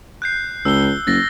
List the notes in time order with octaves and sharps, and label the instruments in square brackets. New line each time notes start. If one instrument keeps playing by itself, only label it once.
[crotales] F#6 G6 C7
[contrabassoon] C#2 [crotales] E6 G7
[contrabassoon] F#1 [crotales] A6 A#6